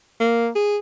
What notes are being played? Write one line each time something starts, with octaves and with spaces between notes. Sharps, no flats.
A#3
G#4